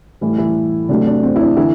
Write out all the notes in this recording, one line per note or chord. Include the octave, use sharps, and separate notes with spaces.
A2 E3 G3 E4
E3 E4
C3 F#3 A3 D4
D4
C4
E4
D4
D3 E3 E4